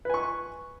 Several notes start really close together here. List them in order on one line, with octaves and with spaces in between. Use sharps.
B4 G#5 C#6